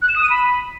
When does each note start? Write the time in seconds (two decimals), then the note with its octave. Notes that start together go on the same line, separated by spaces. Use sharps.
0.02 F#6
0.09 E7
0.16 D#6
0.23 D#7
0.30 B5